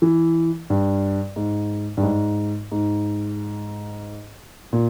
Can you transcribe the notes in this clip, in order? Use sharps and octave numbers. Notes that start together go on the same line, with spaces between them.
E3
G2
G#2
G2
G#2
G#2
A#2